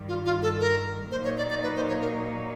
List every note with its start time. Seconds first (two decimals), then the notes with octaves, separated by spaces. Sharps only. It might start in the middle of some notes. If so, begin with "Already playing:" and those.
Already playing: G2 D#3 G3
0.08 F4
0.25 F4
0.42 A4
0.60 A#4
1.11 A#2 F#3 A#3 D#4 C5
1.24 C#5
1.38 D5
1.50 D5
1.63 B4
1.76 C5
1.88 C#5
2.01 A#4